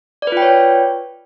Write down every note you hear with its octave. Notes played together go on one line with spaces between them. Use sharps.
F4 B4 C#5 D5 G5